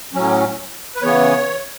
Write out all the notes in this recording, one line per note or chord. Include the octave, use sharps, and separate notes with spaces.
A2 F#3 C#4
B4
C#3 E3 B3 C#5